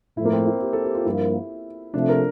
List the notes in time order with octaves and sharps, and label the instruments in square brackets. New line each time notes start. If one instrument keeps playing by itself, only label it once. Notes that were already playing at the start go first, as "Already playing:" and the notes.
[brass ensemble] A2 F3 A3 [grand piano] E4
[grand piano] A#3
C4
E4
G4
A4
G4
F4
[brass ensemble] G2 F3 A#3 [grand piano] E4
[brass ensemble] C3 F3 A3 [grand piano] D4
[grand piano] A#4